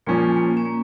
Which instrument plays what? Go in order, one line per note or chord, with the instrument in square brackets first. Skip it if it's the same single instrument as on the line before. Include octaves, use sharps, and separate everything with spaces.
[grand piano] A#2 F3 C#4 [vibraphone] A#3
[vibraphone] A#3
C#4
A#3